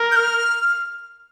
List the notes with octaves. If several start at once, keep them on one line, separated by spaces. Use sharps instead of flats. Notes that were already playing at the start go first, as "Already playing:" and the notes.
Already playing: A#4
G6
F6